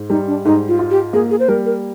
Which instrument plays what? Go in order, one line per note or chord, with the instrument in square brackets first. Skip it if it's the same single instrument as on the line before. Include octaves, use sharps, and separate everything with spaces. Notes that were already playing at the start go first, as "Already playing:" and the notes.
Already playing: [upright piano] G#2
[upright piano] G3 [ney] D#4
[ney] D4
[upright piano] G#2 [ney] D#4
[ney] F4
[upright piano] F4
[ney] G4
[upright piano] A#3 [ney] G#4
[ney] G#4
C5
[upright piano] G3 [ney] A#4
[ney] A#4